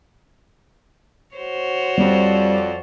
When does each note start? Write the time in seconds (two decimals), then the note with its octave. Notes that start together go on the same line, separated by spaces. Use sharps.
1.35 F#4 C5 C#5
1.98 F2 G3 D5